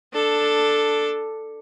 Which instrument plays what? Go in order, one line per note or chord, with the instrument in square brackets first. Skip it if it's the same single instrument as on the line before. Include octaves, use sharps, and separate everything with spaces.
[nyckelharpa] D4 A4